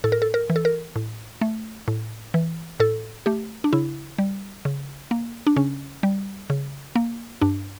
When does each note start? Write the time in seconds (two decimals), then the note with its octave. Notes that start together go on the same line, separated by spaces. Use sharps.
0.04 A2 A4
0.12 A#4
0.22 A4
0.34 A#4
0.50 E3
0.56 A4
0.65 A#4
0.96 A2
1.41 A3
1.88 A2
2.34 E3
2.80 A2 A4
3.26 A3 G4
3.64 D4
3.73 C#3 E4
4.19 G3
4.65 C#3
5.11 A#3
5.47 D4
5.57 C#3 C#4
6.03 G3
6.50 C#3
6.96 A#3
7.41 G2 D4